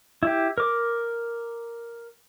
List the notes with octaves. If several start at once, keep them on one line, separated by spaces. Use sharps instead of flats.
E4 G4
A#4 D6